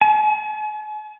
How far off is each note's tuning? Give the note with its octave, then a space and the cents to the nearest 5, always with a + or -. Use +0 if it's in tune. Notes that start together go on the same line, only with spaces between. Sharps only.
G#5 +45